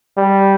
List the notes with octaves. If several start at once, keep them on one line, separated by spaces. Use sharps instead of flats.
G3